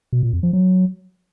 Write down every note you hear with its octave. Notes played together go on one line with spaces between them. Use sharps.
B2
A#2
F2
F3
F#3